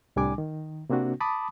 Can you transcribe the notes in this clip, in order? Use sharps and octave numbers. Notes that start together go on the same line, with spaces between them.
C2 A2 G3 D4 G#5 D6
D#3
C3 A#3 C4 D4 F#4
A5 B5 D6 D#6